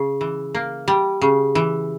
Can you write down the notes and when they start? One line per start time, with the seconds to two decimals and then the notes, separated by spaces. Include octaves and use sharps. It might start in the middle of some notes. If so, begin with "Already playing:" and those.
Already playing: C#3
0.21 E3
0.55 A#3
0.88 G3
1.21 C#3
1.55 E3